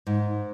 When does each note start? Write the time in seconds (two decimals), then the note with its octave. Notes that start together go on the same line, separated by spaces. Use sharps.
0.07 G#2